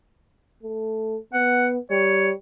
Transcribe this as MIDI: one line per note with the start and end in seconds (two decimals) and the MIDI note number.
0.63 1.17 57
1.33 1.78 59
1.33 1.68 78
1.91 2.33 55
1.91 2.29 73